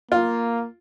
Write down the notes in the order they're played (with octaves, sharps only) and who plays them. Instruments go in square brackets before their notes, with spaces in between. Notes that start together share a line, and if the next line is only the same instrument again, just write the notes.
[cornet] A#3 [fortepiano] F4